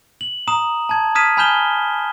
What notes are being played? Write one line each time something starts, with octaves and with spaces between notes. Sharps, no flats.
F#7
A#5 D#6 E7
A5 G#6
D#6 F6 G#6 B6 D#7 E7
G#5 B5 F6 G6 E7 G7